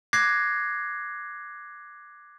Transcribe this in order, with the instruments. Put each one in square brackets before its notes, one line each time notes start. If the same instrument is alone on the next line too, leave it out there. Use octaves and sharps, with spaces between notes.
[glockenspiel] D6 F#6 G#6 A#6 C7